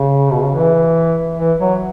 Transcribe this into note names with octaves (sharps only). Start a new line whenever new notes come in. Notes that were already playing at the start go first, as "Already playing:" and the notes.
Already playing: C#3
B2
C#3
E3
E3
F#3